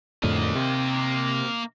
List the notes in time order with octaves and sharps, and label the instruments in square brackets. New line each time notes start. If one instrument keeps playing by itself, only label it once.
[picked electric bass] F2 A2 D3 [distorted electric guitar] A#3 D#5
[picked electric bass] C3